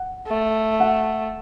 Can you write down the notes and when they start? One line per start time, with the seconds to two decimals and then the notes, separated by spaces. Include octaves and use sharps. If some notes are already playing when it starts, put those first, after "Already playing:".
Already playing: F#5
0.27 A3
0.80 F#5